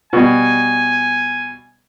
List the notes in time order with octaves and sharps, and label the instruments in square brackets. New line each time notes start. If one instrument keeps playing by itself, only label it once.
[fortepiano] B2 G3 [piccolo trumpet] G#5